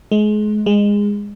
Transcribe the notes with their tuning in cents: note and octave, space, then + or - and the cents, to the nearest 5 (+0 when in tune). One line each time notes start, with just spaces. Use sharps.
G#3 +30
G#3 -20